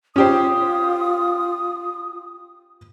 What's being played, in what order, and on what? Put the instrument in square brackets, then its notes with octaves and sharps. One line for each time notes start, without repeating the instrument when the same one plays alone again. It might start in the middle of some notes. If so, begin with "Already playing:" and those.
[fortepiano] C#4 G4 C5 [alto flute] F4 [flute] D#6